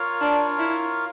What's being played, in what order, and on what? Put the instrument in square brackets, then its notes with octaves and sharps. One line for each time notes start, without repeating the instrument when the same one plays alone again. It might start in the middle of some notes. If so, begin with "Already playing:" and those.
Already playing: [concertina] F4 A#4 C#5 F5
[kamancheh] D4
E4